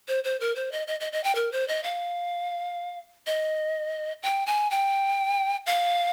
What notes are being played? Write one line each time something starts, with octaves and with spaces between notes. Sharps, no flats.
C5
C5
A#4
C5
D#5
D#5
D#5
D#5
G5
A#4
C5
D#5
F5
D#5
G5
G#5
G5
F5